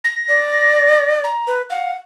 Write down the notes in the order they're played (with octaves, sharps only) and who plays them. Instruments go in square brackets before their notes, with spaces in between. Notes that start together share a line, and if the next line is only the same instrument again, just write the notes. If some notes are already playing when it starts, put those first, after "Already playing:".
[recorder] A#6
[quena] D5
[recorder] A#5
[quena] B4
[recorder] F5 [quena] F#5